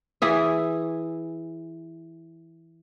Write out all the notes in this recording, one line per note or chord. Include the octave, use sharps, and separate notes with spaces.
E3 G#4 E5